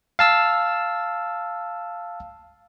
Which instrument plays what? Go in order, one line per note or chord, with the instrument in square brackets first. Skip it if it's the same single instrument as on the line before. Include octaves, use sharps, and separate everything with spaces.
[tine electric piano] F5 A5 E6